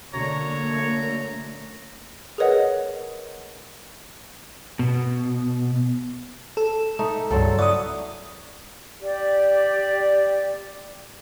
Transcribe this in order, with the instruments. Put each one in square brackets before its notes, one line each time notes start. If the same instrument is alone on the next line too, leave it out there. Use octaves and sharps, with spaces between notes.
[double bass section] D3 A3 A#3 [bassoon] F#3 [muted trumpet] C#5 [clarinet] A#5
[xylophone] G#4 A#4 B4 C#5 D#5 F#5
[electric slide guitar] B2
[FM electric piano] A4
[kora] A3 D#4
[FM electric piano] C#2 G2 [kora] F#3 C4 A4
[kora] E4 F#4 [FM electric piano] D5 D#6
[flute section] G4 D5